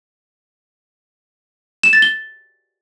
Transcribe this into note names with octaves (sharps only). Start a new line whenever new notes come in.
E7
A6
G7